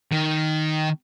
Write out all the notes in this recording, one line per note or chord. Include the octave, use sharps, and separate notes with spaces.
D#3